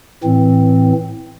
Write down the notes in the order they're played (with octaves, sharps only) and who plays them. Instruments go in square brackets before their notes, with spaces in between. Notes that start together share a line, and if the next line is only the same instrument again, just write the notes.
[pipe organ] A2 E3 C4